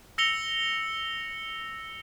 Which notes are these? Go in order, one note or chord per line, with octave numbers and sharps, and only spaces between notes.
E6 A#6 C#7 F7 G7